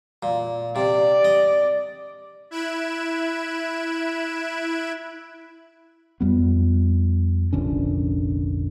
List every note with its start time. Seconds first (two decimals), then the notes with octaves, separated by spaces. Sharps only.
0.23 A#2
0.76 C3 D5
1.25 D#5
2.51 E4 B5 F#6 G#6 D7 E7
6.20 F2 G3 B3
7.53 F1 A#1 D3 C#4